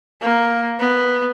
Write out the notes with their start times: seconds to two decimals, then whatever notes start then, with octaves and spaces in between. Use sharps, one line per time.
0.22 A#3
0.80 B3